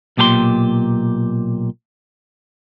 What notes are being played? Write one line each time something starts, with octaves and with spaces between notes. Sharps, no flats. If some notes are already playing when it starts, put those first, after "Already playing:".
B1 A#2 G4 G#4 C6